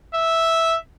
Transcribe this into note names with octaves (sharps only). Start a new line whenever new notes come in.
E5